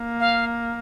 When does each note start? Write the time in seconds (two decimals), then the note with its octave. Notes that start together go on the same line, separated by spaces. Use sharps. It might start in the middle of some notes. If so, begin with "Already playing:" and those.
Already playing: A#3
0.20 F5